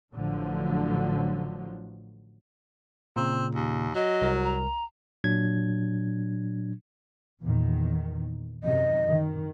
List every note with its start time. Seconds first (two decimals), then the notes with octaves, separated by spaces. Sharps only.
0.13 A1 A2 D3 F3 F#3
3.16 A#2 C#3 C4
3.55 D#2
3.95 F#3 D#5
4.22 C2 A#4
4.44 A#5
5.24 A#2 F#3 D4 G#6
7.42 E2 A#2 D#3
8.64 F#2 C3 D#3 D#5
9.08 D#3